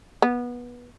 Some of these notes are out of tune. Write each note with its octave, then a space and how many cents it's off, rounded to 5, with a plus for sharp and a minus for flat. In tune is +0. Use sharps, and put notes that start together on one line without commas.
B3 -20